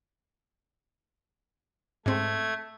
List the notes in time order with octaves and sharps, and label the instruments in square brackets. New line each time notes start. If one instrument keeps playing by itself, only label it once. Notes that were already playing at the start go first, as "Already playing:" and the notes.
[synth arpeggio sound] G#2 C4 [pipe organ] A3 G#6